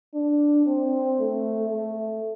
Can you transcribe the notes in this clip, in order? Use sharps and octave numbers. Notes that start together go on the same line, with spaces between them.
D4
C4
A3
A3